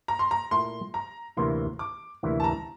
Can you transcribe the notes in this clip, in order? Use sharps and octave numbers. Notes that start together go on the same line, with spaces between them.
A#5
C6
A#5
A#2 A3 E4 C6
A#5
D2 C3 E3 A#3 E4 C6
D6
D2 C3 E3 A#3 E4
A5
A#5